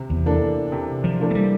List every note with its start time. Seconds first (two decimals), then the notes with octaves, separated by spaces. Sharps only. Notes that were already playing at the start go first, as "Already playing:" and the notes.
Already playing: C3
0.10 E2
0.26 E3 A#3 D4 A4
0.72 C3
1.04 F3
1.20 E3 A#3 D4 A4
1.30 A3
1.35 G3